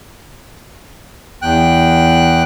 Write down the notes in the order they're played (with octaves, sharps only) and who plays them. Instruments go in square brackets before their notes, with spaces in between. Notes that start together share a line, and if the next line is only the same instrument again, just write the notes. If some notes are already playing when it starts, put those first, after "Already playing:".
[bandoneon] E2 G5 F#6